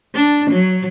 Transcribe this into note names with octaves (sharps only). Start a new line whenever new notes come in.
D4
F#3